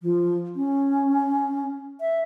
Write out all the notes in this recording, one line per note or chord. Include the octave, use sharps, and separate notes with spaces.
F3
C#4
E5